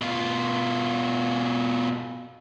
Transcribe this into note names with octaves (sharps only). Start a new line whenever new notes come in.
B2 F4